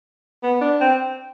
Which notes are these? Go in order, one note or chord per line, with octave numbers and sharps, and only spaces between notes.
B3
D4
C4